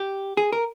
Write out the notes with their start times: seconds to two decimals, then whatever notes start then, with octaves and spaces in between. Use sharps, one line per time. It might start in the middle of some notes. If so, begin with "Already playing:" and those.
Already playing: G4
0.37 G#4
0.52 A#4